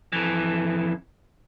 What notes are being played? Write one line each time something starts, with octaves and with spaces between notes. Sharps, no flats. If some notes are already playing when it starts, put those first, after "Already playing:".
F2 E3